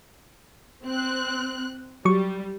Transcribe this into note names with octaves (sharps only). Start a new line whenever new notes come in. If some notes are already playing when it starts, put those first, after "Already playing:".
C4 F#6
F#3 G3 C#6